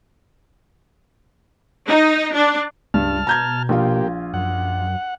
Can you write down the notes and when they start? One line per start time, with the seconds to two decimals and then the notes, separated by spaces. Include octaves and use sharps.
1.89 D#4
2.35 D4
2.94 C#2 G2 A5 F6
3.27 B2 A#5 G6 G#6
3.69 A#1 A#3 F4 G4 F5
4.34 F#2 F#5